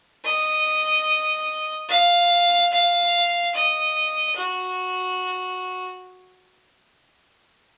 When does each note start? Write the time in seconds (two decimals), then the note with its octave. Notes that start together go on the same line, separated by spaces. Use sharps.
0.25 D#5
1.89 F5
2.72 F5
3.54 D#5
4.37 F#4